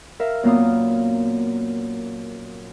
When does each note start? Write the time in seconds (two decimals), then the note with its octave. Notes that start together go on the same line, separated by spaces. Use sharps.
0.20 A#4 E5 F5
0.43 F#2 A#2 A#3 B3 F5 D#6